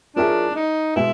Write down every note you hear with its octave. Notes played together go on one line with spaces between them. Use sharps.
F3 A#3 C#4 D4 E4 G#4
D#4
B2 G#3 B3 E4